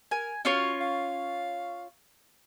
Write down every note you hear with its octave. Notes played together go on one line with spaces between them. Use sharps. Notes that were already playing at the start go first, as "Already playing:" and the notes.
A#4 G#5
C#4 F4 F#4 C#5
F5